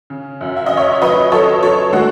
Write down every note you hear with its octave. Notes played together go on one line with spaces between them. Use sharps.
C#3
F#2
E5
D#5
F#2
C#5 E5
C#5
F#3 B4 D#5
F#3 A4 C#5
F#3 A4 C#5
G#3 F#4 A4